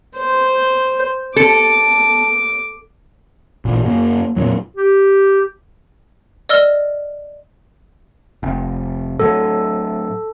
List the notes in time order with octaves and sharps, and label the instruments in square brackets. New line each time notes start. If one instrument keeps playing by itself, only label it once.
[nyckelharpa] C5
[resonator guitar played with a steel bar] A4 [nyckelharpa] D6
[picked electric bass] A1 A#2
F#2 A#3
F2 A#2 F#3
[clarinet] G4
[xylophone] D5 D#5 E6 F6 G7
[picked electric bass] F1
[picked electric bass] A2 F#3 [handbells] A4